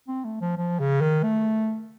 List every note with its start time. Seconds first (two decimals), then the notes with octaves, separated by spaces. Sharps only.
0.08 C4
0.25 A3
0.41 F3
0.57 F3
0.80 C#3
1.01 D#3
1.23 A3